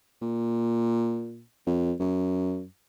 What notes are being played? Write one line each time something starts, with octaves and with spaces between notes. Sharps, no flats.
A#2
F2
F#2